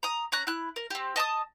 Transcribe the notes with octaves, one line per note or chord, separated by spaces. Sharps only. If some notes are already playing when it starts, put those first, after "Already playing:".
A#5 D#6
C#4 A#5 F#6
E4 F#6
A#4
C4 G4
D#5 A5 D6 D#6